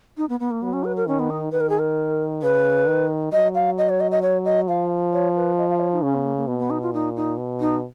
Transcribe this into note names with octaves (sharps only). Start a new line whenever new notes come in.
D#4
B3
B3
A#3
F#3 B3
C#4
B4
A#4
D#3 C#4
B3
D#4
D#3 B4
A#4
G#4
A#4
C#3 B4
D#3
F#3 D#5
F5
D#5
C#5
D#5
D#5
C#5
D#5
F3 F5
C#5
B4
D#5
F5
C#5
D#4
C#3 C#4
B3
A#3
A#3
B2 B3
B3
D#4
F4
A#2 D#4
D#4
B2
D#4